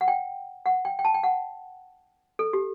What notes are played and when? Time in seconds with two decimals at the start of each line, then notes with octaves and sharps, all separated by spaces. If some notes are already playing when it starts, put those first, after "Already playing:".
0.01 F#5
0.08 G5
0.66 F#5
0.85 G5
0.99 G5
1.05 A5
1.14 G5
1.23 F#5
2.39 A4
2.53 G4